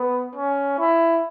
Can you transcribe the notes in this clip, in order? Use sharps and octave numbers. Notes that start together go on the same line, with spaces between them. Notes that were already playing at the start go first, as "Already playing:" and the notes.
Already playing: B3
C#4
E4